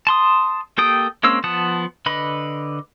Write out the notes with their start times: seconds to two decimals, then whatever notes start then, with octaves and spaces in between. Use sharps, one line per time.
0.07 A5 C6 D#6
0.78 A#3 G4 A4 G5 D#6
1.23 G#3 A#3 C4 C#4 E6
1.44 F3 B3 F#5 A5 D#6
2.06 D3 B4 D#5 B5